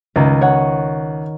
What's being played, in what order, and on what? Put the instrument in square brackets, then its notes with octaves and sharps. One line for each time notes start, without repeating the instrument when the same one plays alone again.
[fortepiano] C#2 [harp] D#3
[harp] C#5 F#5